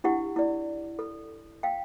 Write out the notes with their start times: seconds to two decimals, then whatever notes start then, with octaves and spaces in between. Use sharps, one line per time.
0.04 D4 E4 G4 F#5
0.36 E4 D5
0.99 A4
1.63 F5 G5